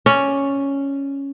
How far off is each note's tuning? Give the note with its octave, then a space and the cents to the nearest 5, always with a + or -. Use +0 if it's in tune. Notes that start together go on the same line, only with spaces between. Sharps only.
C#4 +0 D5 +0